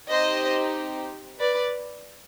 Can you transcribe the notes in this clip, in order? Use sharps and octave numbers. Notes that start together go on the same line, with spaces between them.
C4 D#4 G4 C5 D#5
B4 D5